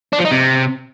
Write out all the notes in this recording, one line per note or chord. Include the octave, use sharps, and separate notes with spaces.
D4
F3
D#4
C3